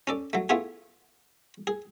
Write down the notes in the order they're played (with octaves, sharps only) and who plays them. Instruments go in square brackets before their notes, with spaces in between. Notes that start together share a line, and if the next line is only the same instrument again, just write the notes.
[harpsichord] C#4 A4 D5
F#3 A3
A3 B3 E4 F4 G#4
G#4